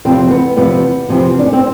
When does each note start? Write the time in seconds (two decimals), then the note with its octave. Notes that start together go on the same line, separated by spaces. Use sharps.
0.05 E2 C3 F3 C4
0.31 B3
0.56 E2 C3 F3 B3
1.09 E2 C3 F3
1.39 D4
1.46 C#4
1.53 C4